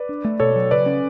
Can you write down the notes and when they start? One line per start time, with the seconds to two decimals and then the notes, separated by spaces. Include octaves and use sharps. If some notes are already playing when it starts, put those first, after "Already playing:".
Already playing: B4 D5
0.09 D4
0.25 A3
0.40 B2 A4 C#5
0.55 F#3
0.71 C#3 B4 D5
0.86 C#4